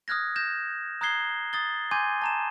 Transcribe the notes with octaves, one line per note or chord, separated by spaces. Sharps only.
D#6 F6 F#6 G#6 A#6
G6 A#6 E7
A#5 D#6 F#6 G#6 C7 G7
D#6 A6 G7
G#5 C6 D6 G6 G#6 D#7
A5 A#5 E7